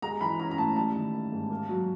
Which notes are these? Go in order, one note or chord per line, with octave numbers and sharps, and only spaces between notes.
G#3 A#5
E3 B5
C#4 A#5
A#5
A2 A5
G3 A5
D#3
A#3
G#2
A#3
F#3